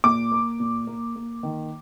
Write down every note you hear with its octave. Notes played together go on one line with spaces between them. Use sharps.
A#2 D6
A#3
A#2
A#3
A#3
D#3